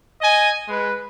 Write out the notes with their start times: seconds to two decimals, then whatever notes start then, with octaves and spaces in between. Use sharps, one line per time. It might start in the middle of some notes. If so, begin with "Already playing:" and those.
0.22 D#5 G#5
0.69 G#3 B4